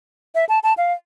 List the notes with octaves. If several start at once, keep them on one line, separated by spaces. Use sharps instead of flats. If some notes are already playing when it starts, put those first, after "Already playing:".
E5
A5
A5
F5